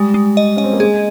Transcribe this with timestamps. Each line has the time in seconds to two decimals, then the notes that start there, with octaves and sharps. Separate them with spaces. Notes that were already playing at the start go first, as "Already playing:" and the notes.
Already playing: G3 G#3
0.14 G#3
0.37 D#5
0.57 C#4 D#5
0.64 C4
0.73 A#3
0.80 G#3 G#4